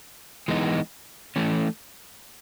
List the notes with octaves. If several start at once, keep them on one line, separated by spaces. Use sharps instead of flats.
E3 G#3 B3 D#4
E3 A3 C#4